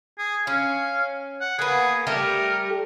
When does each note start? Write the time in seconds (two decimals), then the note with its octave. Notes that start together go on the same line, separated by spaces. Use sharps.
0.18 G#4
0.47 C#4 F5
1.41 F#5
1.59 A#3 B3 G#4
2.07 G3 A3 G4 A#4